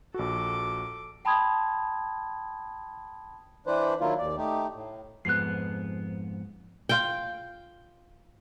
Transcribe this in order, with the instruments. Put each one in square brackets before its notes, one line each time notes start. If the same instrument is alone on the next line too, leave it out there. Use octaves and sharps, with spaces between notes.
[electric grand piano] A#1 F#4 [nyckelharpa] A4 D6
[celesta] G5 A5 B5 C6 D#6 G#6
[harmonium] E3 D4 B4 C5
D#3 F#3 A#3 E4 F4
D#2 D5
A3 D#4 G4
A2
[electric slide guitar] F2 G#2 B3 [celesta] F#6 C7
[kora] F4 G5